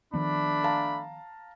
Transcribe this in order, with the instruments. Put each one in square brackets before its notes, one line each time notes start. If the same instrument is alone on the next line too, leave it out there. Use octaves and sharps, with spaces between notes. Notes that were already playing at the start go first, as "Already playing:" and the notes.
[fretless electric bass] D#3 F3 B3 [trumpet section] A3 D4 [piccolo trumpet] B5
[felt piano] F5 A5 A#5